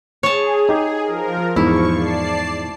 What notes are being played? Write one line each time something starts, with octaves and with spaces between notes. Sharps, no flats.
G#4 C#5 A5
D#4 G4
F3 A#4
E2 G#2 F3 E4 C#6
D5 A5 C7